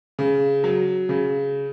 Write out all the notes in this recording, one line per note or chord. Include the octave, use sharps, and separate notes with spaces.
C#3
F#3
C#3